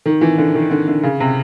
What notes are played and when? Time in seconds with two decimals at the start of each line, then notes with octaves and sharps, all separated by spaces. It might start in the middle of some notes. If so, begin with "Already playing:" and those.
0.06 D#3
0.21 E3
0.38 D3
0.55 D#3
0.71 D3
0.88 D3
1.03 C#3
1.20 C3